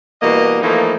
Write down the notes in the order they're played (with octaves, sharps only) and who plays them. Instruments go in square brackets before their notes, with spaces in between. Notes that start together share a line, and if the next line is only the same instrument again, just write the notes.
[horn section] B2 E3 G3 A#3 D#5
E3 F3 A3 A#3 D#4